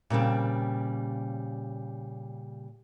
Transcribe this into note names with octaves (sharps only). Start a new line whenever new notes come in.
A#2 C#3 G3 C4